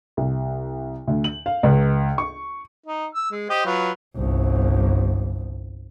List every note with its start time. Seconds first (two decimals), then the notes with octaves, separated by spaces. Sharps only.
0.17 C2
1.07 D2
1.24 F#7
1.46 F5
1.63 C#2
2.18 C#6
2.86 D#4
3.15 E6
3.32 G#3
3.50 G4 C5 D#5
3.66 F#3 F4 B4
4.16 G1 C2